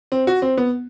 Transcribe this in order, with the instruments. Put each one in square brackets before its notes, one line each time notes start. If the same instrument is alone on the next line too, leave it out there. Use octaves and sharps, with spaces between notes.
[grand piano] C4
F#4
C4
B3